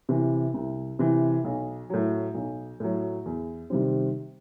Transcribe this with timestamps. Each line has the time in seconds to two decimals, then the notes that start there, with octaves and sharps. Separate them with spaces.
0.09 C3 E3
0.54 C2
0.99 C3 E3
1.44 B1
1.90 A2 F#3
2.35 B1
2.80 A2 F#3
3.26 E2
3.70 C3 D#3 G3 C4